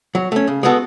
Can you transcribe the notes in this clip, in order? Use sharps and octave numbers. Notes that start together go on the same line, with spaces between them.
F#3
A3 C#4
C#3
G#3 B3 F#4 A4